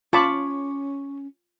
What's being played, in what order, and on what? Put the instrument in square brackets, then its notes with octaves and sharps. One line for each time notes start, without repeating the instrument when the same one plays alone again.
[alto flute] C#4 [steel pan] F4 A5 B5 [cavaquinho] C#5 D6